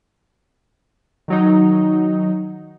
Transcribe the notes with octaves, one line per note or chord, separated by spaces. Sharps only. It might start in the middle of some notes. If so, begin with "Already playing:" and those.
D#3 F#3 D#4